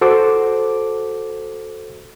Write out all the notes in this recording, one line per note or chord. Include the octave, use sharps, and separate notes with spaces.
F#4 A4 C5 D6